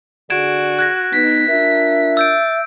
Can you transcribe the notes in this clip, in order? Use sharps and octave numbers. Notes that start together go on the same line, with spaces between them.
D3 F#4 G#4 D5 G#6 D7 E7
F#6 G#6 A#6
B3 D#4 B6
D4 F4 A#4 E5
E6 G6 A6 D7